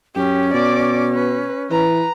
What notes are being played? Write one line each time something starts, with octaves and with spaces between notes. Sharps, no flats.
F#2 C#4 G4
B2 D5 D6
B4
E3 B4 A#5